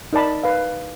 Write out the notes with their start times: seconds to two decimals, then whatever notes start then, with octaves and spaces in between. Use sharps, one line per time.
0.13 D#4 A#4 D5 A5 B5
0.43 B4 F5